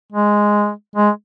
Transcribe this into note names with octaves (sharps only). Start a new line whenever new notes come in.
G#3
G#3